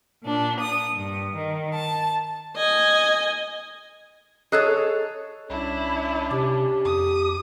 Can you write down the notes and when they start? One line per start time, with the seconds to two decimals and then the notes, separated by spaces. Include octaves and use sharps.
0.24 A#2 D4
0.61 D#6
0.93 G2
1.36 D#3
1.75 A5
2.56 D#5 G#5
4.52 G#4 A4 C#5 D#5 F#6
5.50 C2 C#4 D4 E4
6.31 C3 G4
6.85 F2 D#6